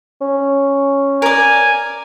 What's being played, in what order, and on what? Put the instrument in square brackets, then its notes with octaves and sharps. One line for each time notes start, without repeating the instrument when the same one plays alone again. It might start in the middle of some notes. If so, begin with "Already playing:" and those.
[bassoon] C#4
[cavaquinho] A#4 D5 [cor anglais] G#5